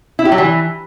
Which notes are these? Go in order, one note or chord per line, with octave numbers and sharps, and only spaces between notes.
E4
G4
F#3
E3